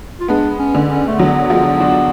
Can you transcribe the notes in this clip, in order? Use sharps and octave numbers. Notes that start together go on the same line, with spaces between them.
F4
G#3 B3 D4
C#4
D3
C#4
A3
D3 F#3 B3
F3 G#3
D4 F#4